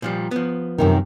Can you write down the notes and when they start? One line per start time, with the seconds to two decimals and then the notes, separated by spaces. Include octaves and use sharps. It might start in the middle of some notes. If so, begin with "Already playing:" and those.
0.02 A#2 F3 G3
0.31 F3 B3
0.78 F#2 C3 D#3